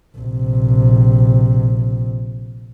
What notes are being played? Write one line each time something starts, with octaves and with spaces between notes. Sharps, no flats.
A#1 C3